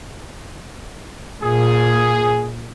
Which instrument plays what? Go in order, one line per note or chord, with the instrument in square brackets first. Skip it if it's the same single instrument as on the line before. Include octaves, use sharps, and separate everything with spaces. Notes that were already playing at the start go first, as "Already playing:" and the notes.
[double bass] A#2 [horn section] G#4